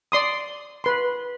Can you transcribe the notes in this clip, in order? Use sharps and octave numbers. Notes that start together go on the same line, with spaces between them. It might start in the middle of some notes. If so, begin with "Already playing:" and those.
D5 C6 D#6
B4 C6